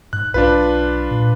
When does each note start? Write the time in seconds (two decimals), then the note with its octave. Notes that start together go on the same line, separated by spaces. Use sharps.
0.13 G#2 F#6
0.34 B1 D4 F4 B4
1.11 A#2